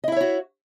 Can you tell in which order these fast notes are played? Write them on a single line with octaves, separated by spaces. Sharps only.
D#5 E4 E5 C#5 F#4